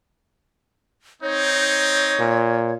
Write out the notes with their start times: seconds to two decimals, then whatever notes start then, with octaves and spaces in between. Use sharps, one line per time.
1.22 C4 D#4 C#5
2.19 A#2